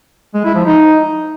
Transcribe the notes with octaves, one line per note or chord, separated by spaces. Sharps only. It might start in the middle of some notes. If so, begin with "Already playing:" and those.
G#3
E4
F3
D#4